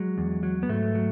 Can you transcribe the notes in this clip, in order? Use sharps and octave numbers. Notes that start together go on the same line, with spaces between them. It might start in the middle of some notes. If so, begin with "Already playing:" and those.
Already playing: F#3 G#3
E2
F#3
B3
G#2 A3
F#3